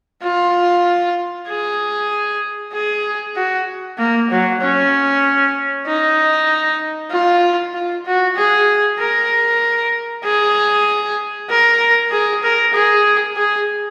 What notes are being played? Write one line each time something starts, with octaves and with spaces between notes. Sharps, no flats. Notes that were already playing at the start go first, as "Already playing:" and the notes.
F4
G#4
G#4
F#4
A#3
F#3
C#4
D#4
F4
F4
F#4
G#4
A#4
G#4
A#4
G#4
A#4
G#4
G#4